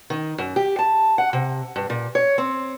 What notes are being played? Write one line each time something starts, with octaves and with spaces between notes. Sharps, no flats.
D#3
F#2
G4
A5
F#5
C3
G2
A#2
C#5
C4